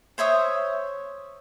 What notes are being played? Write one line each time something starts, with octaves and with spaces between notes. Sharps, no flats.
C5 C#5 E5 D#6